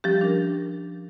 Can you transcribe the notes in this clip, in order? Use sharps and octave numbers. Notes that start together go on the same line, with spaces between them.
F3 G3 C#4 G4
D4 A#4